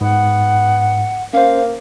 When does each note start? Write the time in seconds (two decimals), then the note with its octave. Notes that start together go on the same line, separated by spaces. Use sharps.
0.01 G#2 B3 F#5
1.33 A#3 C#4 C5 F5